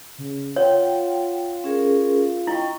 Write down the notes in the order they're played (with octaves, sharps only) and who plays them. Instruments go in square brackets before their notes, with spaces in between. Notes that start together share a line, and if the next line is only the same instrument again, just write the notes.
[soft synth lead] C#3
[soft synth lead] F4 [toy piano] C#5 [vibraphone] F#5 G5
[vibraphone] C#4 G#4 A#4
[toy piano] E4 [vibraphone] D#5 G5 C#6